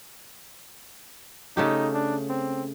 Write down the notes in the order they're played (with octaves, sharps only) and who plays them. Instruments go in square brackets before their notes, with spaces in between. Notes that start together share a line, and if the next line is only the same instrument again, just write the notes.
[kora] C#3 A3 G4 [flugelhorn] D#4
[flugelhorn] D4
C4